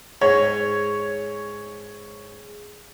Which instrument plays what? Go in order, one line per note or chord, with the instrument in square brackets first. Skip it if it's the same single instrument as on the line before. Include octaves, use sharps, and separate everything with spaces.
[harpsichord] G#2 [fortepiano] C#5